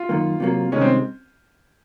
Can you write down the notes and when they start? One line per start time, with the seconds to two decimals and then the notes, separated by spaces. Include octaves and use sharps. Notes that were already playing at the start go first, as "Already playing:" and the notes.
Already playing: F4
0.09 F#2 D#3 A#3
0.40 C3 F#3 A#3
0.72 C2 C3 D#3 G#3 C#4 D#4
0.81 C4